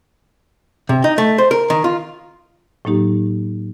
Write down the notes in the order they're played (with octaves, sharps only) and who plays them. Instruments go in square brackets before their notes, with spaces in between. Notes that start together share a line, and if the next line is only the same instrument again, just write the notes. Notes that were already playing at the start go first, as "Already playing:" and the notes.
[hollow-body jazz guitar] C3
D#4
A3
C5
A#4
D#3
F4
[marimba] A2 F#3 A#3 D#4 G4